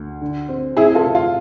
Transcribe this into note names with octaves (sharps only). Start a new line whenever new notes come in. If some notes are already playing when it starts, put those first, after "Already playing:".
Already playing: D2
D3
C4
C3 E4 G#4
F4 A4
C3
F4